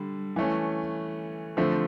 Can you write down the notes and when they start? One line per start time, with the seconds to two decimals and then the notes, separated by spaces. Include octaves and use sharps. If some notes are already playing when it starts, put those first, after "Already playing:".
Already playing: D3 G3
0.36 E3 A3 C#4
1.57 D3 F3 A3 C4